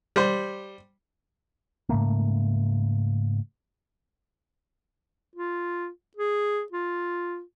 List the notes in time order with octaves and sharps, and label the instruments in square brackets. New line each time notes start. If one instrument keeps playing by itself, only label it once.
[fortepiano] G3 C5
[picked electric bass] G#2 C#3 A3 A#3
[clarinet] F4
G#4
F4